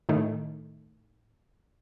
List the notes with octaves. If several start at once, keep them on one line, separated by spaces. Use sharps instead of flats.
A2 D#3 A3